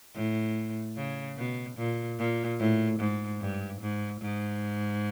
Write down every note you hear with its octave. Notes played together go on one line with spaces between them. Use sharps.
A2
C#3
B2
A#2
A#2
A2
G#2
G2
G#2
G#2